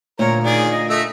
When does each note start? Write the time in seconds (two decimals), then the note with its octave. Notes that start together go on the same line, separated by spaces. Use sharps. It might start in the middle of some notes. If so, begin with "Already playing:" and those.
0.19 D2 A#2 A#4 C#5 A#5
0.44 D#3 G#4 D5
0.71 D#5
0.90 A3 D#5 E5